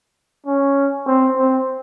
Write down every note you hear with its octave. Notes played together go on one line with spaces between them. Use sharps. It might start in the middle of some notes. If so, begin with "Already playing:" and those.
C#4
C4
C4